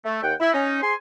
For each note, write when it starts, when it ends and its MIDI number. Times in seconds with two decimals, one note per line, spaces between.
0.04 0.20 57
0.23 0.33 39
0.23 0.33 78
0.23 0.33 79
0.40 0.49 64
0.53 0.80 61
0.53 0.80 63
0.81 0.93 68
0.81 0.93 72
0.81 0.93 80
0.81 0.93 84